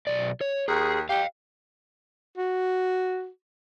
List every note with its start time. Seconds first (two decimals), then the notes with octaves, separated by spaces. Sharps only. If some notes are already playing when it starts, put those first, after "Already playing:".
0.07 B1 D5
0.41 C#5
0.68 D#2 G#4
1.09 G4 F5 G5
2.37 F#4